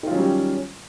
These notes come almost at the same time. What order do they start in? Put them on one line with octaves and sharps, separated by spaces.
D#3 F4 F#3 C#4 G3